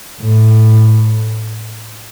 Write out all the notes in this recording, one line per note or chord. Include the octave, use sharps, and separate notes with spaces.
A2